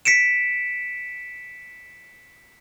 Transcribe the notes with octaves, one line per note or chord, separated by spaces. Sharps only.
B6 C#7 D7 E7